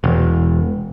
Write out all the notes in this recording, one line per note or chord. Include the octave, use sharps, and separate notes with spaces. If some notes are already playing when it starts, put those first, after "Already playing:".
E1